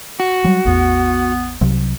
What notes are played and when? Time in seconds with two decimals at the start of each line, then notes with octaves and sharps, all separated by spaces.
0.20 F#4
0.44 F#3 G3
0.65 A1 E2 B3
1.61 C2 C3 F#3